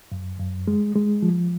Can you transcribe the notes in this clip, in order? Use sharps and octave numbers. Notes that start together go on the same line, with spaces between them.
F#2
F#2
G#3
G#3
F3